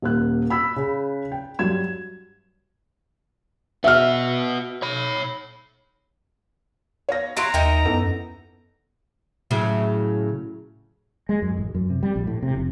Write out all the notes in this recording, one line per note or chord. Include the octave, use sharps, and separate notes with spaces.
D#1 A#3 F#6
B5 E6 B6
C#3
G5
G2 F#3 G#6 E7
B3 F#4 E5 F6
C#5 B5
C#5 F5 A#6
E4 F#4 F5 A#5 C6 D7
D#2 D#4 A#4 E5 G5
A1 F#2 B3 A4
A2 C#3 F#3
G#3
F#2
A1
F#2
C3
G3
A#1
A2
C3
F1